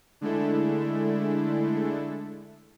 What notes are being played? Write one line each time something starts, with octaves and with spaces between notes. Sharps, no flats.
D3 G#3 A3 D4 E4 A4